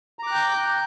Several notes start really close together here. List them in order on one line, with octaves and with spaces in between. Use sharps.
A#5 D6 F#6 G5 G6